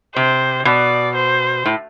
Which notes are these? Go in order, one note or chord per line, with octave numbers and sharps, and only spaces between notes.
C3 C5
B2 D5
C5
A2